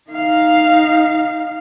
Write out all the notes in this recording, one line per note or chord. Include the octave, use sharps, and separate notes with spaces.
D#4 F5